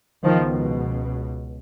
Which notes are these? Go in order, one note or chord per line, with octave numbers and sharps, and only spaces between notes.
C#2 B2 D#3 F3